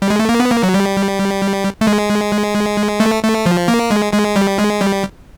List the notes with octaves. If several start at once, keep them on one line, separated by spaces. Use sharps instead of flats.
G3
G#3
A3
A#3
B3
A#3
F#3
G3
A3
G#3
A3
A3
F3
A#3
G#3
G#3
G3
G#3
G3